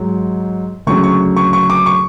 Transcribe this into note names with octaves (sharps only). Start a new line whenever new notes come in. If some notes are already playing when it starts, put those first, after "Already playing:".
Already playing: G#2 F#3
D2 C#3 F#3 C#6
C#6
C#6
C#6
D6
C#6